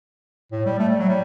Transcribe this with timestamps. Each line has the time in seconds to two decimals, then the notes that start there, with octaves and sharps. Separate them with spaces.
0.52 A2
0.66 G3
0.79 A3
0.89 G3
0.99 F#3
1.09 G3